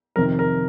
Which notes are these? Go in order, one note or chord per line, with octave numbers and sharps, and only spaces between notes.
F2 C3 D#3 A#4
A#4